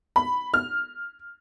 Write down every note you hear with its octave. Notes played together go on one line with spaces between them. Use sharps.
B5
F6